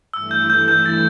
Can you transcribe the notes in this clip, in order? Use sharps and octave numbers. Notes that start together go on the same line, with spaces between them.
G2 E3 A3 E4 E6
G6
G6
G6
A6